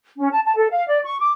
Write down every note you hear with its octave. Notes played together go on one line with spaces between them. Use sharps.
C#4
A5
A5
A4
F5
D5
C#6
D6